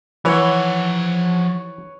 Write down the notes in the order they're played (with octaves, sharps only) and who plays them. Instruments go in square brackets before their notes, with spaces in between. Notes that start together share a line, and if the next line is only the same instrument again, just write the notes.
[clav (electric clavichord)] E3 [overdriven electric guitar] F3 F#5 [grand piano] B4 C#5